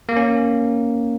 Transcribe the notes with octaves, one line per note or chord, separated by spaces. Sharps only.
A#3
C#4